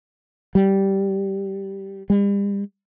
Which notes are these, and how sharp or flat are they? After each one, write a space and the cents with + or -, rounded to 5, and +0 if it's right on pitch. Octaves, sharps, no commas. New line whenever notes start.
G3 -10
G3 +40